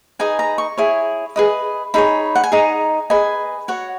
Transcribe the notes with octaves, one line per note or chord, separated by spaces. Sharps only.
D#4 G#4 B4 D#5 G#5
A#5
C#6
E4 G#4 C#5
G#4 B4 D#5
D#4 G#4 C#5 B5
F#5
G#5
D#4 G#4 D#5 A#5
G#4 B4 D#5 G#5
F#4 C#5 F#5